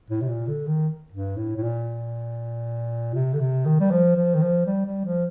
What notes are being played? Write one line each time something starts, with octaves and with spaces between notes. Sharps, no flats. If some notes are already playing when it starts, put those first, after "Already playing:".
A2
C3
A#2
D3
D#3
G2
A2
A2
A#2
C3
D3
C3
D#3
G3
F3
F3
D#3
F3
G3
G3
F3